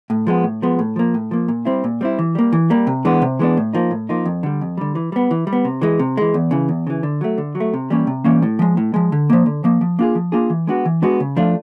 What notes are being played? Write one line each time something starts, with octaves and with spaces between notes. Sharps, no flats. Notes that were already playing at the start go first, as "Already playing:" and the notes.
A2
F3 G#3 B3
A2
F3 G#3 B3
A2
F3 A#3
A2
F3 A#3
A#2
G3 C4 E4
A#2
G3 C4 E4
E3
G3 A#3
E3
G3 A#3
C3
E3 G#3 B3 D4
C3
E3 G#3 B3 D4
A2
F3 A#3 D#4
A2
F3 A#3 D#4
F2
D3 G3
F2
D3 G3
E3
G3 B3
E3
G3
B3
C3
E3 G#3
C3
E3 G#3
E2
C#3 E3
E2
C#3 E3
D3
F#3 A3
D3
F#3
A3
C3
E3 G3 A#3 C#4
C3
E3 G3 A#3 C#4
A2
F3 G#3
A2
F3 G#3
D3
F3 A#3
D3
F3 A#3
F3
A#3 D4 F4 G#4
F3
A#3 D4 F4 G#4
E3
G#3 B3 D4 F#4
E3
G#3 B3 D4 F#4
C#3
F3 A3 D4 F4